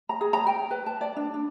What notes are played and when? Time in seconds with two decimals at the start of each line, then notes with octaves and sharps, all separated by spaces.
0.09 A#5
0.21 G#4
0.33 A#5
0.47 G5
0.71 B4
0.86 A5
1.01 D5
1.16 D4
1.34 D4